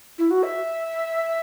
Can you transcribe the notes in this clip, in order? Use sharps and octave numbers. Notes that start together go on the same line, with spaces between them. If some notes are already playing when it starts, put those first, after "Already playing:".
E4
F#4
E5